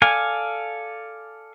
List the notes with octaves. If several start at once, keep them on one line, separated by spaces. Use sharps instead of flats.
A4 D5 F5 G#5